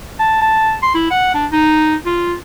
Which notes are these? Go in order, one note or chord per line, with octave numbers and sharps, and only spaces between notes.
A5
A5
C6
E4
F#5
D4
D#4
F4